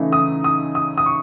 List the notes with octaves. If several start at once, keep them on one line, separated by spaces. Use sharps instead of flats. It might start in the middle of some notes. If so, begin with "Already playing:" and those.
Already playing: C#3 E3 A3 D#4
D#6
D#6
D#6
D#6
C#6